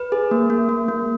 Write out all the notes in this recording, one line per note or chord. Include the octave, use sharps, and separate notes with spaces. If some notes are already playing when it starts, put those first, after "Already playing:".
Already playing: B4
G#4
A#3
A#3
A#3
A#3